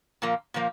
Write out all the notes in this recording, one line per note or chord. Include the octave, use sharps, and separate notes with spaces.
A#2 F3 A#3
A#2 F3 A#3